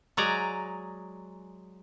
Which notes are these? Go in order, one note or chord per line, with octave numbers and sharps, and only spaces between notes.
F#3 G#3 D5 G#5 A#5